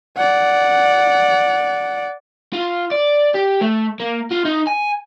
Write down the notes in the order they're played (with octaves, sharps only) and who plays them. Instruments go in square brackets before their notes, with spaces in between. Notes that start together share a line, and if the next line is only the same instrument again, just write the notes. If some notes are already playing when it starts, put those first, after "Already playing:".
[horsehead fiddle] D5 F#5
[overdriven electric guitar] F4
D5
G4
A3
A#3
F4
D#4
G#5